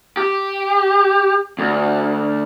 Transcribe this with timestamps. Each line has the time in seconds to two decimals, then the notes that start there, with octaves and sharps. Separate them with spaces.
0.17 G4
1.59 D2